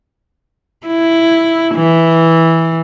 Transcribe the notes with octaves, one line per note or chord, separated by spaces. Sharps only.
E4
E3